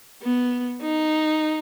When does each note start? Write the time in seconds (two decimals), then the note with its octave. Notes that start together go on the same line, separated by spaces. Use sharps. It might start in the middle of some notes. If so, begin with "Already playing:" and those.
0.22 B3
0.82 D#4